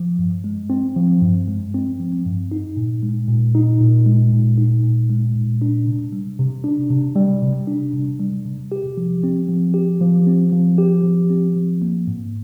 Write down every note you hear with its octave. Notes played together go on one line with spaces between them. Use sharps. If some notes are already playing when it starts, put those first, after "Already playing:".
Already playing: F3
G2
G#3
C4
F3
G2
G#3
C4
F3
G2
D#4
A#2
G#3
A#2
D#4
A#2
G#3
A#2
D#4
A#2
G#3
A#2
D4
C3
G3
C3
D4
C3
G3
C3
D4
C3
G3
C3
G4
F3
C4
F3
G4
F3
C4
F3
G4
F3
C4
F3
A#3
G#2